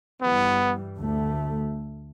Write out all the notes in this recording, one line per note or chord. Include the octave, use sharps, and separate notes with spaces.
G2 E3 G3 B3
D2 D3 A3